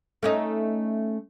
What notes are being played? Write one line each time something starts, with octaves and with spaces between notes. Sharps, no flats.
A3 C#4 D#4